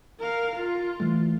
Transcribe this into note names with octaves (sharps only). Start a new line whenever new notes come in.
A#4 F5
F4
E3 G3 A3